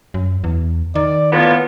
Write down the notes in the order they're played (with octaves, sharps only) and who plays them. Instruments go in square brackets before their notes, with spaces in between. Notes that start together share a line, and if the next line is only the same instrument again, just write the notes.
[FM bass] F#2
E2
[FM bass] D#3 [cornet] D5
[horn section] A2 A#3 B3 [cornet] F4